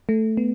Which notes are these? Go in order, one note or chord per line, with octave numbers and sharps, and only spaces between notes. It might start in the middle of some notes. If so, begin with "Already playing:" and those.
A3
B3